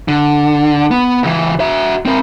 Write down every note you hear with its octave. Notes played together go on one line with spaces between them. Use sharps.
D3
B3
C#2 E3
F#4 E5
C4 A#4